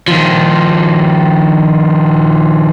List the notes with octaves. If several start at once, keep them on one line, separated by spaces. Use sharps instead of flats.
D#3 F3